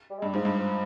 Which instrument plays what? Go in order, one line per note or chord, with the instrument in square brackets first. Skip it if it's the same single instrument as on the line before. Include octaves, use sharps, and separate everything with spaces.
[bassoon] G3
G#3
[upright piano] G2 [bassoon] G3
[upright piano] G#2 [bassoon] F3
[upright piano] G2
[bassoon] F3